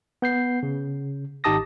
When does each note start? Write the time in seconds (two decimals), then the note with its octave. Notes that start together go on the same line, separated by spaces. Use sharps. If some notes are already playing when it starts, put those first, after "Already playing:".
0.22 B3 G6 C7
0.63 C#3
1.44 G#1 D#4 G4 A5 D#6 A#6